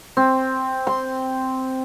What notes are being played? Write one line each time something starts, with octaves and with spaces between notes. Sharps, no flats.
C4
C6